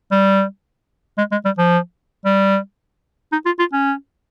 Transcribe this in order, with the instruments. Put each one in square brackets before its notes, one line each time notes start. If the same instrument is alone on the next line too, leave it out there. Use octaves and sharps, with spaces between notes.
[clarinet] G3
G#3
G#3
G3
F3
G3
D#4
F4
F4
C#4